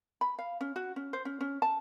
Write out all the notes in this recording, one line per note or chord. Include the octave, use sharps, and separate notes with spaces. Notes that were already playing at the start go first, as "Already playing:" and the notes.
B5
F5
C#4
F#4
C#4
C5
C#4
C#4
A5